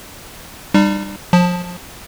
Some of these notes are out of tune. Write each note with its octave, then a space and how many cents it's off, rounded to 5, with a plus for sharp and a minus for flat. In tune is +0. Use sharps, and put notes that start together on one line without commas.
G3 +10 D#4 -40
F3 +30 A5 +0